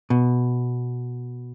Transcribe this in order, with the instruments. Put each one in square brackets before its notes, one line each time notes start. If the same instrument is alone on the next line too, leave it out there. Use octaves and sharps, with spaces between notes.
[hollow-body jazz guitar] B2